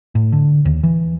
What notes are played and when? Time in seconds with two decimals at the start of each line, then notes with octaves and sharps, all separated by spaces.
0.15 A2
0.32 D3
0.65 D#2
0.83 E3